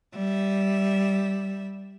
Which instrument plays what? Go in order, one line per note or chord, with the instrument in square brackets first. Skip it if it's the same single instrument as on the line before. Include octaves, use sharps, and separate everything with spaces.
[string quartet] G3 E5